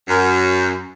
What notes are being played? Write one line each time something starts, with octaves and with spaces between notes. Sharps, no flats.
F#2